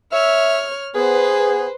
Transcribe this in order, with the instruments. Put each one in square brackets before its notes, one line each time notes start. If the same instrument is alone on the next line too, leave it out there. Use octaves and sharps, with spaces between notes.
[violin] C#5 F6 [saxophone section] E5
[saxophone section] B3 G#4 [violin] B4 C5